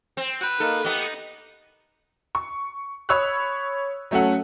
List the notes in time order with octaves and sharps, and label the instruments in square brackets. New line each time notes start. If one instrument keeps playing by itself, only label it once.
[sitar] C4
[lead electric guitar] F#4 B4 [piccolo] F#6
[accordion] A#3 D#4 A#4 [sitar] A4
[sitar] A3 B3 [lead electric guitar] D#4 [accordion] G4
[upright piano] C#6
C#5 B5 C#6 D#6 E6 F#6
F#3 A3 C#4 A4 F#5